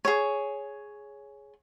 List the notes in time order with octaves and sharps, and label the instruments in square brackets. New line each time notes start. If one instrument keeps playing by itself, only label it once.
[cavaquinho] G#4 C#5